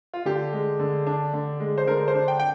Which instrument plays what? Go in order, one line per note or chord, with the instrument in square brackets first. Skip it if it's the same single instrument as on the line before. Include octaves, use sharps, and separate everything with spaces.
[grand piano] F4
D3 G4
G#3
D3
D4
D3
G#3
C5
D3 A#4
C5
D4
G5
G5